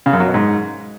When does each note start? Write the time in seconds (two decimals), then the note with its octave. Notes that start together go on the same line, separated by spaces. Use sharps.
0.06 C#3
0.13 F#2
0.20 F#3
0.27 B2
0.34 G#2